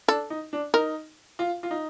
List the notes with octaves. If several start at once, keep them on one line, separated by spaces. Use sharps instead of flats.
D4 A4
D#4
D4
D#4 A#4
F4
F4
D#4